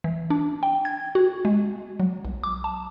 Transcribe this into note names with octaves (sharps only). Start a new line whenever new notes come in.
E3
D4
G5
G#6
F#4
G#3
F#3
B1
D6
A5